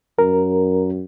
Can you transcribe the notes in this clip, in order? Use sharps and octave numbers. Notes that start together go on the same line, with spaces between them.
F#2 A#4